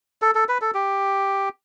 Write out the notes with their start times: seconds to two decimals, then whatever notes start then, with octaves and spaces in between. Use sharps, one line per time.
0.22 A4
0.35 A4
0.49 B4
0.62 A4
0.74 G4